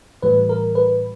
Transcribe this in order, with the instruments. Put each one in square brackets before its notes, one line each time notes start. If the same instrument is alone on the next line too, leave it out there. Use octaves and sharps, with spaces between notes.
[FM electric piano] A2 E3 G3 B4
A#4
B4